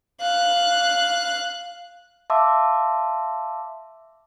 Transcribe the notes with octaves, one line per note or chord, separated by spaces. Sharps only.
F5 F#6
E5 F5 A5 C6 D6 E6